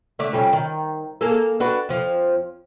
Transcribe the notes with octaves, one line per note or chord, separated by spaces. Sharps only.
D3 A3 D5
F2 G3 C#4
D#3
A#3 G#4 A4
D4 F#4 B4
F2 F3